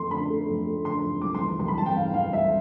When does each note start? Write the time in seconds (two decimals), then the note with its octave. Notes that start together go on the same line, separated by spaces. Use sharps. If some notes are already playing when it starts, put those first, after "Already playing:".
Already playing: F2 A3 C6
0.11 D3 B5
0.30 A3
0.49 F2
0.67 A3
0.85 D3 C6
1.04 F2
1.21 C2 D6
1.35 C6
1.41 E3
1.59 C2 C6
1.68 B5
1.77 C2 A5
1.86 G5
1.95 E3 F5
2.14 E3 F5
2.33 C2 E5